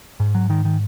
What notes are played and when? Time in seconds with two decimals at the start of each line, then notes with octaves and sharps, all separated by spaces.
0.20 G#2
0.35 F#3
0.50 D#3
0.65 D#3